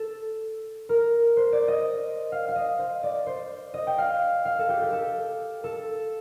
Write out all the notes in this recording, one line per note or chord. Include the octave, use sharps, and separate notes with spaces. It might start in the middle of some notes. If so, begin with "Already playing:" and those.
Already playing: A4
A#4
C5
D5
D#5
F5
F5
D#5
C5
D5
C5
D#5
G5
F5
F5
A4
G4
G4
A4
A4